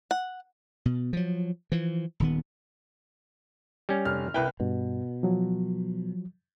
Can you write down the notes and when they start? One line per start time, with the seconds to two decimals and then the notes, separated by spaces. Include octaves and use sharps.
0.11 F#5
0.85 B2
1.13 F3 F#3
1.72 E3 F3
2.20 D#1 D#3 B3
3.89 G3 C#4
4.05 F1 F6
4.34 C2 E4 B4 G5
4.60 G2 B2
5.23 F3 F#3